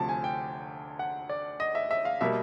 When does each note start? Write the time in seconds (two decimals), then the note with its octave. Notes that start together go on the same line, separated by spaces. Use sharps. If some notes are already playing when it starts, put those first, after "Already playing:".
Already playing: D2 C3 F3 A5
0.09 G#5
0.24 G5
0.99 F#5
1.29 D5
1.60 D#5
1.75 E5
1.91 E5
2.05 F5
2.21 B2 G3 A#3 E5